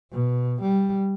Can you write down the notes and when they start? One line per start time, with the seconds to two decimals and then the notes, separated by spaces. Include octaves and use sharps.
0.12 B2
0.61 G3